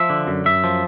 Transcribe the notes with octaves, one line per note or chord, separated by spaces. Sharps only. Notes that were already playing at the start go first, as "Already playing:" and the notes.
Already playing: F3 E5
D3
F#2
F#2 E5
F3